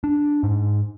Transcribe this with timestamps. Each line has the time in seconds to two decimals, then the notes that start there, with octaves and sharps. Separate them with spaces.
0.04 D4
0.43 G#2